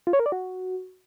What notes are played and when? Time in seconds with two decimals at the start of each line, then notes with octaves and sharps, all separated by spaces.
0.07 F4
0.13 C#5
0.20 A#4
0.26 D5
0.32 F#4